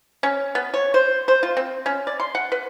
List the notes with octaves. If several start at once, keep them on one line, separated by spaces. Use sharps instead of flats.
C#4
B3
C#5
C5
C5
F4
C4
C#4
D5
C6
F#5
B4